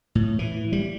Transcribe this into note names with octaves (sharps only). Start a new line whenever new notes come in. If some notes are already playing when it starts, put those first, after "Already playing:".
A2
E3
G3